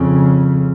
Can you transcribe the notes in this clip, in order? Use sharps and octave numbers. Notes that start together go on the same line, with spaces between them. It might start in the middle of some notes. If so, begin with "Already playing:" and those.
Already playing: F2 C#3